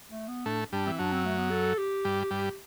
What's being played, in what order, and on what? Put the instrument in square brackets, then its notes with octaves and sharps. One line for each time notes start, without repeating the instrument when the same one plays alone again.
[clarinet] A3
B3
[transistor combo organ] A2 A3 [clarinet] D4
[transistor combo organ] G2 G3 [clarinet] D4
[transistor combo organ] E3 [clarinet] C4
[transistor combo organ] F#2 F#3 [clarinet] D4
[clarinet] C4
A3
B3
A4
G4
[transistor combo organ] G2 G3
G2 G3